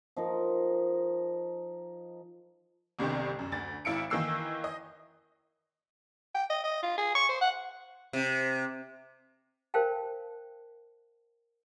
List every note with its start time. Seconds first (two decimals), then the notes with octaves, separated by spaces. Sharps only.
0.16 F3 D#4 A#4
2.99 G1 C2 G2 C3 D#3
3.39 F#2
3.52 D2 A6
3.85 G#1 E4 E5 F5 C#7 D7
4.10 D#3 E3 A#3 E6 C7
4.64 D#5
6.35 G5
6.50 D#5
6.64 D#5
6.83 F4
6.98 G#4
7.15 C#6
7.29 C5
7.41 F#5
8.13 C3
9.74 A#4 C5 F5 G5 A5